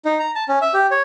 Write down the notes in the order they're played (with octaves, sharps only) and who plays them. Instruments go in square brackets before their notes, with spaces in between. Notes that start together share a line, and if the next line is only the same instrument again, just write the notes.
[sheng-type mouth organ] D#4
A#5
A5
C#4
E5
G4
C#5